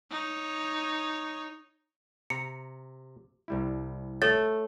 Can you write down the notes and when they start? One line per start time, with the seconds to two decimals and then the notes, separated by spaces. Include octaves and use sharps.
0.11 D#4 C#5
2.30 C3 A#5 C#7
3.48 C2 G3 E4
4.22 A3 C#5 A6